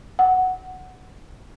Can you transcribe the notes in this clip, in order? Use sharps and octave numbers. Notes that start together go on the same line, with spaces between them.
F#5